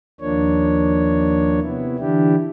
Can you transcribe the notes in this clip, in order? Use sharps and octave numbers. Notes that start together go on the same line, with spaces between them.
D#2 F3 A#3 D4 C#5
C3 B3 E4
D3 E3 D4 E4 G4